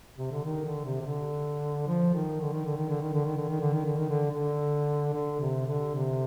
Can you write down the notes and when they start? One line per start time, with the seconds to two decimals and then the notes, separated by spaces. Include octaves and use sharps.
0.18 C3
0.31 D3
0.44 D#3
0.65 D3
0.85 C3
1.01 C3
1.06 D3
1.87 F3
2.14 D#3
2.41 D3
2.53 D#3
2.66 D3
2.77 D#3
2.90 D3
3.01 D#3
3.14 D3
3.26 D#3
3.37 D3
3.49 D#3
3.61 D3
3.73 D#3
3.85 D3
3.97 D#3
4.09 D3
4.31 D3
5.13 D3
5.40 C3
5.67 D3
5.95 C3